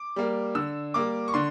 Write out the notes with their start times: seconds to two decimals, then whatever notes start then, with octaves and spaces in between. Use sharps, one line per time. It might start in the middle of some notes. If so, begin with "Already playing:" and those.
Already playing: D6
0.16 G3 A#3
0.55 D3 E6
0.94 G3 A#3 D6
1.28 C#6
1.34 D3 C6